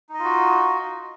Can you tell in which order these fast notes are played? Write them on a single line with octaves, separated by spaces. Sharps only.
D#4 D#5 F4 F#4